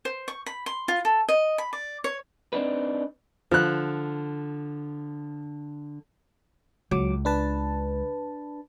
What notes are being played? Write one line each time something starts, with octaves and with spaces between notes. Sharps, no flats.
C5
C#6
B5
C6
F4
A4
D#5
B5
D5
C#5
C4 D4 D#4 B4
D3 F3 F#6
C#2 F#3 D6
D4 B4 A5